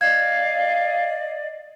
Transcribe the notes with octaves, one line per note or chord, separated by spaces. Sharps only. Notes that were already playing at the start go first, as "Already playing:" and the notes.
D5 D#5 F5 G#6